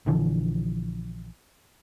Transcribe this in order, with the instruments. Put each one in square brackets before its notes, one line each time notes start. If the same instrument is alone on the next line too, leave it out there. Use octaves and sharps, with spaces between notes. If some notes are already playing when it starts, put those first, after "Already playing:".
[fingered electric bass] A#1 D3 E3 F3